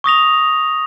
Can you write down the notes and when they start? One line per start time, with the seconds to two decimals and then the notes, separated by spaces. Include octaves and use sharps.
0.04 C#6 D#6 A#6 F7